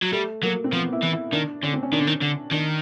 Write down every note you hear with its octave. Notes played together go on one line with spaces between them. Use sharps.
F#3
G3 A3
F#3 A#3
C4
F3 B3
E4
E3
E4
D#3 D4
D3 C#4
C4
C#4
D#3 D4
D3
D#3
D3
D#3 D4